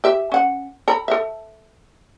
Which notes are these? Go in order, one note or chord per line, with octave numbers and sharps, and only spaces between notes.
G4 E5
C#4 F#5
A4 A#5 B5
A4 E5